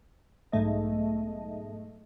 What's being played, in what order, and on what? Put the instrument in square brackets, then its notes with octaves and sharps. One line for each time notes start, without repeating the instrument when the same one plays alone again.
[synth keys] B1 G#2 A3 D#5